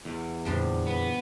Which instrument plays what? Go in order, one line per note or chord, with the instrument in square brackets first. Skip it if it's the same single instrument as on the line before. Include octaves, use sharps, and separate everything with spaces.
[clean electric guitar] E2
[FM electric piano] F2 A#2 D3 [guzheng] F3 G3 D4
[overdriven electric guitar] B3